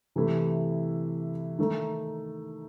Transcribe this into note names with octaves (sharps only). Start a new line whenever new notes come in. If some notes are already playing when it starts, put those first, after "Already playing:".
C3 E3 A3 E4
D#3 A3 D#4